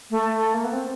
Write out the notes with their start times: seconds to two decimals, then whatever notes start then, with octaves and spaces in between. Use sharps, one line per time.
0.11 A3
0.54 A#3
0.64 B3
0.73 C4